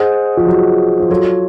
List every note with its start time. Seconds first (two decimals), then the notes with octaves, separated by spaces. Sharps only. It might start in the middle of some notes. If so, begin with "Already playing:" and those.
Already playing: G#4 C5 D#5 F#5
0.37 F3
0.46 F#3
1.00 F3
1.10 F#3 F4 A4 C#5